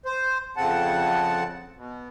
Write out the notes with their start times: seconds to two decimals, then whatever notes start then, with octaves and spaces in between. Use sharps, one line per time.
0.06 C5
0.57 F2 C#3 C4 F#5 A5
1.76 B2